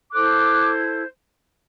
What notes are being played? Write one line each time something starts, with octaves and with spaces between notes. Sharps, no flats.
E4 A4 C5 D6 F#6